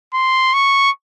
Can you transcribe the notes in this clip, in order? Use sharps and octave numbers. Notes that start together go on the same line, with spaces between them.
C6
C#6